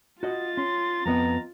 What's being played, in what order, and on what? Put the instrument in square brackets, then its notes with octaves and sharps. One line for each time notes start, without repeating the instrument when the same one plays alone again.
[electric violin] F4 A6 [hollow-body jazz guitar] F#4 D#5
[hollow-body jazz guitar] C#4 [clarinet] C6
[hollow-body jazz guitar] F2 B3 D#5 [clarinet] A#5